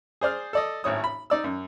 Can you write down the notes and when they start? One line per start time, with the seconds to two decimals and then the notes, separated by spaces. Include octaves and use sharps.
0.21 G#4 C5 D5 F6
0.53 A4 D5 D#5
0.84 G#1 A2 C#5 D#6
1.04 B5
1.30 D#4 D5 E6
1.44 F#2